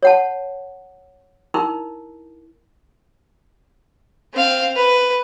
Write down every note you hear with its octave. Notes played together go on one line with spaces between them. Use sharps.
C#5 F#5 A5
D#4 E4 A#4
C4 F5
B4